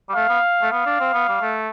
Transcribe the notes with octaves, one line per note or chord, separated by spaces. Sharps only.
G3
A3 F5
B3
A3
B3 F5
D4
C4
B3
G3
A3